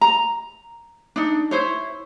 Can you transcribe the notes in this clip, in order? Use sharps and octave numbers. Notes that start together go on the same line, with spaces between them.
A#5
D4 D#4
E4 C5 C#5